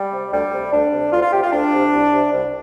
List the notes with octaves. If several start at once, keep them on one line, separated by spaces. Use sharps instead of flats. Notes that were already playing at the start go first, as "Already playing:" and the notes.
Already playing: G3
C3
D2 G3
C3
D2 D4
C3
D2 F4
F4
C3 G4
F4
D2 D4
C3
C2
C3
C2